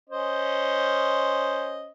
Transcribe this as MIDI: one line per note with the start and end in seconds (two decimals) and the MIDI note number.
0.10 1.90 61
0.10 1.90 72
0.10 1.90 75